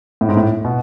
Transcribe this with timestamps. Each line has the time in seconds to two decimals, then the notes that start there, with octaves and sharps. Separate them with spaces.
0.21 A2
0.29 G#2
0.37 A2
0.64 B2